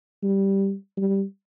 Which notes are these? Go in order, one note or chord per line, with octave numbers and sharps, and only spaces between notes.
G3
G3